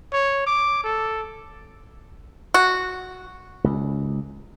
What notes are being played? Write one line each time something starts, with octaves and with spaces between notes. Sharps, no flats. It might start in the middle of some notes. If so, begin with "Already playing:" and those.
C#5
D6
A4
F#4
C#2